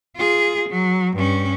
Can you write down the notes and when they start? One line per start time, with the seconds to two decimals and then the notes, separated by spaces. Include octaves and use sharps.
0.16 F4 G#4
0.69 F#3
1.16 G2 C#4